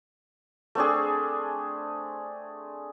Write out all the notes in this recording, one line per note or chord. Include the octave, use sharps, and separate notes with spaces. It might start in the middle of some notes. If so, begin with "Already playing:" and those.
A3 C4 D4 G#4